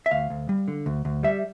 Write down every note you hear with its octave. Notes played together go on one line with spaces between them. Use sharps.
E5
D2 F5
D2
G3
D3
D2
D2
G3 E5